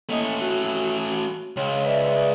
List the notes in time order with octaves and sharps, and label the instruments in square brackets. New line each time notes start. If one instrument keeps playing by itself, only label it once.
[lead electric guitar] A3 C#4 [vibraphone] A#3 D#5 D#6
[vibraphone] F#4
[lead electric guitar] C#2 [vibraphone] C#5
[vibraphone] B4 D5 E5